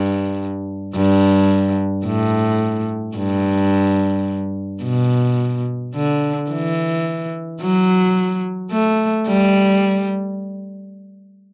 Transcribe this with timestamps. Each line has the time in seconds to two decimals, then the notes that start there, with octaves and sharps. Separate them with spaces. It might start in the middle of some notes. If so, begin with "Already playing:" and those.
Already playing: G2
0.96 G2
2.06 A2
3.17 G2
4.83 B2
5.95 D3
6.51 E3
7.61 F#3
8.72 A3
9.27 G3